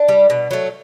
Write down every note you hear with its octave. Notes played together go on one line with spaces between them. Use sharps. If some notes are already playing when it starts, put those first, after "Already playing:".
Already playing: D4
G3
B2
F#3 A3